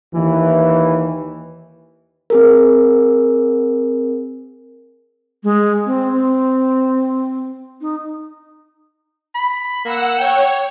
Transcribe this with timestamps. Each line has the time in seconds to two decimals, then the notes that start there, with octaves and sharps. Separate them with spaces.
0.14 D#2 E3
2.30 C4 G#4 A#4
5.43 G#3
5.86 C4
6.12 C4
7.81 D#4
9.35 B5
9.85 A#3 F#5 E6
10.18 C#5 G5